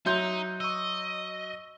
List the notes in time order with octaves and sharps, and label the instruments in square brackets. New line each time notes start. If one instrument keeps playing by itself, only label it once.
[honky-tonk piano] F#3 C6 G6 [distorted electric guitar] D#4 [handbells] E5
[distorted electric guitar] D#5 [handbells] C#6 E6